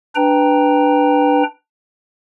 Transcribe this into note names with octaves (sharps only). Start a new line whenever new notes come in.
D4 B4 G5 A#5